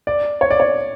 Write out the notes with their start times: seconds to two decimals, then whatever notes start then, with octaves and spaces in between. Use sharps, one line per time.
0.07 D5
0.41 C#5
0.51 D5
0.60 C#5